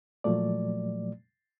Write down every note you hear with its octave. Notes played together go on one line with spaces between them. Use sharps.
A#2 F3 F#3 A3 D5